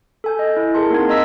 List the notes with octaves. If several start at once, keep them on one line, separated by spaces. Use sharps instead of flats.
A4 G#5 G6
D#5
E4
G#4 A#4 A5 C6
A#3 C4 D#4 F#5 G#6
A#3 D#5 A#5 E6 B6